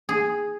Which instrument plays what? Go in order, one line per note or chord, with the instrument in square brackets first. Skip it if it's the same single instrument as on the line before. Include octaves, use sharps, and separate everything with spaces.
[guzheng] G#4